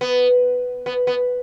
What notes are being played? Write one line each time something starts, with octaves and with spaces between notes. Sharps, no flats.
B3
B3
B3